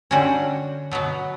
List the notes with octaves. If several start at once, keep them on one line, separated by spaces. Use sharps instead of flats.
D3 G3 C#4 F#4
B2 F#3 B3